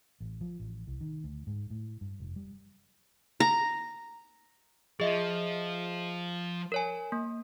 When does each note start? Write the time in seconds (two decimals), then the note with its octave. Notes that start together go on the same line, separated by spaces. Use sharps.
0.21 A1
0.41 F3
0.60 A1
0.87 C2
1.01 D#3
1.24 D2
1.47 G#2
1.70 A2
2.01 G2
2.20 F1
2.36 G3
3.40 A#5
5.00 F3 G#4 D#5 E5
6.72 A#4 C#5 G#5
7.12 A#3